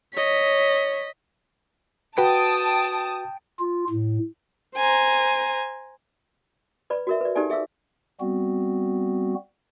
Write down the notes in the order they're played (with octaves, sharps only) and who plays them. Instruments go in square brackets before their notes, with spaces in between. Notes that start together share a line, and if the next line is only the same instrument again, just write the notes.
[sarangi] C#5 [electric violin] D#5 B6
[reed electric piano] F#4 B4 [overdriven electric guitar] G5 [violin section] A5 D#6
[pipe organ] F4
A2
[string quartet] C5 G#5 A#5
[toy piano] B4 D5 B5
F#4 A#4 E5
B4 D5
D#4 G4 A4 D5 G#5
G#4 E5 F5 E6
[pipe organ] G3 B3 C4 F#4